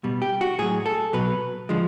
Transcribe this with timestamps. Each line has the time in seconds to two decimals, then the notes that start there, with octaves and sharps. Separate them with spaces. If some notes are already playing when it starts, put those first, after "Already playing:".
0.04 B2 G3
0.22 G4
0.41 F#4
0.58 A2 F#3 G#4
0.86 A4
1.13 B2 F#3 B4
1.69 D3 F3 G#3